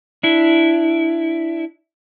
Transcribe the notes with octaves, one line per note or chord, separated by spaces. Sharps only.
D4 E4